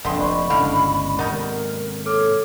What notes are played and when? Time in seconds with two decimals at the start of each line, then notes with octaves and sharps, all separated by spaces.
0.05 F1 A#2 D3 E5 G5 C6
0.19 D5 D#5 B5 C#6
0.50 G1 C#2 G#2 D3 E4 F5
1.19 G#2 C3 D#3 B3 D#4 A#4
2.06 A4 C#5 D6 F6